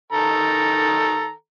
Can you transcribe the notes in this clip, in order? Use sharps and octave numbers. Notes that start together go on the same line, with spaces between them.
D#3 A4 A#5